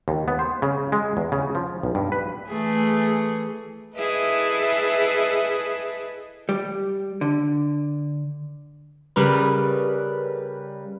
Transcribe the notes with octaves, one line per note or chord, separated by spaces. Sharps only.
D#2
B3
C5
C#3
G#3
E2
C#3
F3
B1
G2
B4
E3 A3 G#4
E4 G#4 A4 B4 D#5 E5
G3
D3
C#3 G3 A#4 B4